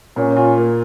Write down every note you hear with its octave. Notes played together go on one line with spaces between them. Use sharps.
A#2 C#4
F4
A#3